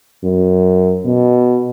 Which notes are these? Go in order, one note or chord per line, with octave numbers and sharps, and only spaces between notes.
F#2
B2